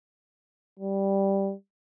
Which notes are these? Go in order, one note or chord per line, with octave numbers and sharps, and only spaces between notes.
G3